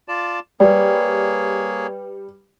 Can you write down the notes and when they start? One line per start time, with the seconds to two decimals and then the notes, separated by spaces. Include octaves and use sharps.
0.08 F4 D5 A5
0.60 G3 A#3 G#4 B4 C#5 D5 G5